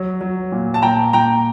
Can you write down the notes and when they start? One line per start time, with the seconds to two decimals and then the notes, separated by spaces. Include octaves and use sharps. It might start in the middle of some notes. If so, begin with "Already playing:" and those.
Already playing: F#3
0.21 F#3
0.52 A#2
0.74 A5
0.82 A#2 G5 A#5
1.13 A#2 G5 A#5